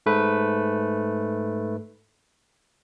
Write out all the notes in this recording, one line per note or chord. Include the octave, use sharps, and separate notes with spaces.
G#2 A3 B4